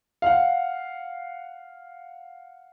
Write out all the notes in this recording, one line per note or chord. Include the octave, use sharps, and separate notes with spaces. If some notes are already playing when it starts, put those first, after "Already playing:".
F5 F#5